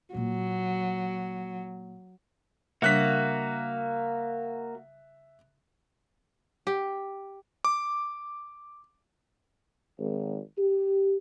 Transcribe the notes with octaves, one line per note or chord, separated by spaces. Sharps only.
A#2 F#3 A#3
C#3 G3 A#3 D4 F#4 E5 F#6 B6
G4
D6
G#1
G4